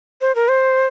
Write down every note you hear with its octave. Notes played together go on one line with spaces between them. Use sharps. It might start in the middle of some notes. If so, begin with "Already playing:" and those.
C5
A#4
C5